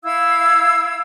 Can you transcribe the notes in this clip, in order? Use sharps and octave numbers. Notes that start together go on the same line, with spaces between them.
E4 F5 E6 G#6